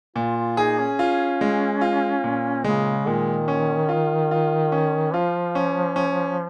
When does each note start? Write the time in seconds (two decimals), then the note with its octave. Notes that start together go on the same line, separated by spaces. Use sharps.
0.16 A#2 F4
0.37 F4
0.57 D#4 G#4
0.79 C#4
0.99 F4
1.41 G#3
1.81 F4
2.24 A#2
2.64 C#3 G#3
3.07 A#2 D#3
3.48 C#4
3.89 F4
4.31 F4
4.72 C#4
5.14 F3 F4
5.55 C#4
5.96 C#4